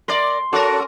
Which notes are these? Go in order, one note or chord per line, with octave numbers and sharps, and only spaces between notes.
A#4 D5 C6
C#4 F#4 A4 A#4